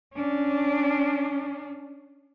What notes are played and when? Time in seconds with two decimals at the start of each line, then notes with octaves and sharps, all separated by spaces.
0.13 C#4 D4